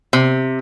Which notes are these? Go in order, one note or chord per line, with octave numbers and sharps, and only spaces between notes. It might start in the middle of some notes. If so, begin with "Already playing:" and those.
C3